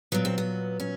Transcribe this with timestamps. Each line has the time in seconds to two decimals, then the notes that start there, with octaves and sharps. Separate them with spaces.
0.12 A#2 F#3 B3
0.25 C4
0.38 B3
0.80 C#4